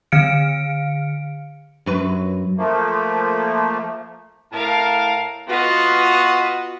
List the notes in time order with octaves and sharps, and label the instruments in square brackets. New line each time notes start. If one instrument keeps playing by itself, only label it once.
[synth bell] D3 F5 F6 C#7 D7
[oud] F#2 F#3 B4
[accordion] F3 A3 A#3
[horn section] A2 A5 [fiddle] A#4 F5
[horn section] B3 F#4 [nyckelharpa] F4 [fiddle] B4 D#5